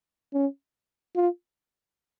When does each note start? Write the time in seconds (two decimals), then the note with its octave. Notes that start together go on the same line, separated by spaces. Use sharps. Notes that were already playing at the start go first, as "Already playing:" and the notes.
0.34 C#4
1.16 F4